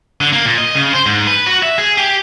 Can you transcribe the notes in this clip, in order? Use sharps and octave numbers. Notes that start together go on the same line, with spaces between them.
D3
A#3
A#2
D#5
C#3
C5
G#2
B4
F#4
E5
G#4
G4